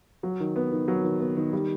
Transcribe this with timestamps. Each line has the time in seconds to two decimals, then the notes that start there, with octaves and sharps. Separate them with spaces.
0.23 F#3
0.40 D#3
0.56 B3
0.72 D#3
0.88 F#3
1.04 D#3
1.20 B3
1.37 D#3
1.53 G3